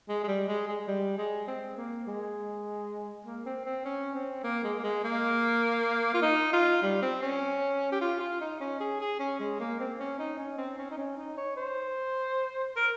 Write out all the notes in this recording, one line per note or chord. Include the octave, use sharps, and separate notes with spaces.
G#3
G#3
G3
G#3
G#3
G#3
G3
G#3
C4
A#3
G#3
A#3
C4
C4
C#4
C4
A#3
G#3
A#3
G#3
A#3
F4
D#4
F4
G3
C4
C#4
G4
F4
F4
D#4
C#4
G#4
G#4
C#4
G#3
A#3
C4
C#4
D#4
C#4
C4
C#4
D#4
C#4
D#4
C#5
C5
A#4